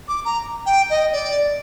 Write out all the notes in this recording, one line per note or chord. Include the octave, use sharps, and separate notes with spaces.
D6
A#5
G5
D#5
D5